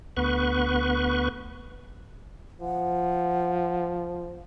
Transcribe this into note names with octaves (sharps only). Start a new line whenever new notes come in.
D2 B3 B4 C#6
F3 F#5